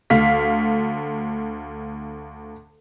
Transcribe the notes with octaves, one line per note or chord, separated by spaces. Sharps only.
D2 F5 B6